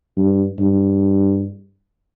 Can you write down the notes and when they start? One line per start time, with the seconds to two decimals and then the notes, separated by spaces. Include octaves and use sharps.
0.17 G2
0.59 G2